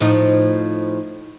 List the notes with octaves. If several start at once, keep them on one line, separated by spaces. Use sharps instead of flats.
A2 F3 D#4